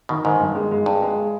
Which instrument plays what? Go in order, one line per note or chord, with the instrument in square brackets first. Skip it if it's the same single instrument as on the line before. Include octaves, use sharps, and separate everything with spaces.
[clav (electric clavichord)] B2 [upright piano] D#3
[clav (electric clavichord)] G#2 [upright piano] D#3
[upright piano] G2
G#3
G#3
[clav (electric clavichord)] G2 [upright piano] G#3
[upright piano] G#3